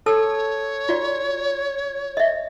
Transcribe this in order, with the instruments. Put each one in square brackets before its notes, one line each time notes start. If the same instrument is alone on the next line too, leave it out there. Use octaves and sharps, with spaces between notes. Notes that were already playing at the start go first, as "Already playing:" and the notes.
[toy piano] A4 A5 E6 [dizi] C#5
[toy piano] F4 F#4 D5
D#5 E5